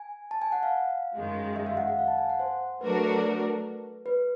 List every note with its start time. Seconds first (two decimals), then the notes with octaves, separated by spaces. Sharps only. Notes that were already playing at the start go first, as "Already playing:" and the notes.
Already playing: G#5
0.31 A5
0.42 G#5
0.52 F#5
0.63 F5
1.14 F#2 D#3 G#3
1.56 E5
1.66 F5
1.77 F#5
1.88 F#5
1.98 F5
2.08 A5
2.18 G#5
2.30 F#5
2.40 C5
2.81 F#3 A3 D4 F#4 A#4 B4
4.06 B4